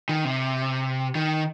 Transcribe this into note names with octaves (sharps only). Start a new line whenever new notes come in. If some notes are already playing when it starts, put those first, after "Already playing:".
D#3
C3
D#3